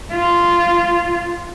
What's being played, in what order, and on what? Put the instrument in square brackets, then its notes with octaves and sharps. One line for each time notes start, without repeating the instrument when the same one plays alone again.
[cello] F4